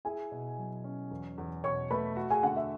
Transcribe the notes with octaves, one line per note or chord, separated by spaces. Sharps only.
E4 G#4 G#5
B2
F#3
C#4
E2
E2
B2 C#5 C#6
A3 B4 B5
F#4
G#4 G#5
D3 F#5
E5